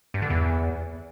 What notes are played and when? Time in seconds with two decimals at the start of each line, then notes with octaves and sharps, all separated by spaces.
0.14 G2
0.22 D3
0.30 E2